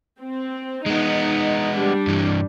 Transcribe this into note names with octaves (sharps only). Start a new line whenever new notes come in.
C4
G#3 B3 D#4
G3 D4
G2 E3